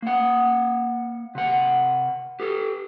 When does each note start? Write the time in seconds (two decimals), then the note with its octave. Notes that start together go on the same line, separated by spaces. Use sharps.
0.02 A#3 F#5
1.35 C3 F#5
2.40 G4 A4